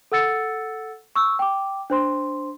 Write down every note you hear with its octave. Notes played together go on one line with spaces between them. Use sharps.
A4 F#5 E6 A6 C#7
C#6 E6
G5 D6
D4 C5 C6